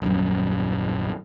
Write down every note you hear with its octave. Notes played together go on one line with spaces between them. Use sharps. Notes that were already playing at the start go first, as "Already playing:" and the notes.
D#1 A#1 F#2